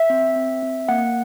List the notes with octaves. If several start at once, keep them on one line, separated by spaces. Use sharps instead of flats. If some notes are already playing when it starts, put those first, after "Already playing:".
Already playing: E5
C4
C4
C4
A#3 F#5